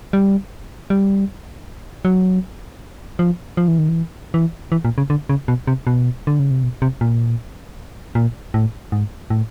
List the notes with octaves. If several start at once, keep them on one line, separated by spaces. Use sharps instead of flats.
G3
G3
F#3
F3
F3
E3
D#3
E3
E3
E3
A#2
C#3
D3
C#3
B2
C3
B2
D3
C#3
C3
B2
C3
A#2
A#2
A2
G#2
A2